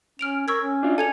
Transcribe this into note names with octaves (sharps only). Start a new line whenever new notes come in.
C#4 F6 D7 F7
A#4 C#6 E6 G#6
C#4
D4 F4
C#4 A4 G#5 G#6 F7